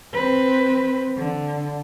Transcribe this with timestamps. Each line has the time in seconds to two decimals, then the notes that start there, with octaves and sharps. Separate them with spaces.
0.13 C4 B4
1.17 D3